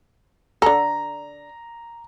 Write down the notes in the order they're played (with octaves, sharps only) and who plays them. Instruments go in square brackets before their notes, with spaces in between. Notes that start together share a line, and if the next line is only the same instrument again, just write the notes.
[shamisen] D3 A4 [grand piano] A#5